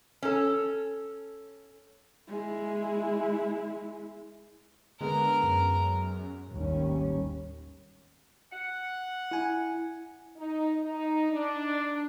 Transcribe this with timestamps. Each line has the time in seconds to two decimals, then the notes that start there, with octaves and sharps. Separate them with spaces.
0.23 C#4 A4
2.28 G#3 E4
5.01 D3 G#3 B3 A#4
5.43 F#2
6.51 G#1 D#2 G3 C#4
8.51 F#5
9.31 E4 G#5
10.37 D#4
10.83 D#4
11.31 D4